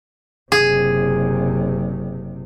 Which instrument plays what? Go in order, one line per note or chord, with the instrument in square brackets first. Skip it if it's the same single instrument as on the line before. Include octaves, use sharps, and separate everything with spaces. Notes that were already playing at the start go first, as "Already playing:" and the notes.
[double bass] F#1 C3 [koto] G#4